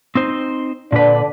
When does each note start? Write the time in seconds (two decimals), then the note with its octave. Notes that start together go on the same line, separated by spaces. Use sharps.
0.15 C4 D#4 C5
0.92 A#2 D3 D4 B4